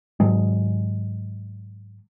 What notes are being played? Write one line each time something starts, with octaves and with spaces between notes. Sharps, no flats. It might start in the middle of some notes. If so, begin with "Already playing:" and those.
G#2 D#3 F#3 G#3